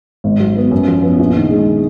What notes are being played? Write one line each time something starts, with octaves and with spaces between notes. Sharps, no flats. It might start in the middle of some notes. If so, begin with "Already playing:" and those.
G#1
F#3
B3
F#2
F3
B3
A#1
D#3
G#3